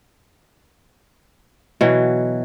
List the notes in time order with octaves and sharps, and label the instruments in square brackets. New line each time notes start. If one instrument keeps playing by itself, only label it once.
[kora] B2 E3 F#3